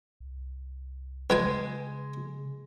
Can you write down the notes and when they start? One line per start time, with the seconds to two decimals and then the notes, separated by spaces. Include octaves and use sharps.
0.20 C2
1.30 C#3 G#3 B4 G5 G#5